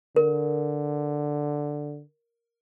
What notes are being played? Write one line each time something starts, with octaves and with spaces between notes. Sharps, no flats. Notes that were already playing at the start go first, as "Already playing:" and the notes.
D3 A#4